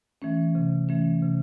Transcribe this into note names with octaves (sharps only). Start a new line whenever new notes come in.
E3 A3 C#4
C3
E3 A3 C#4
C3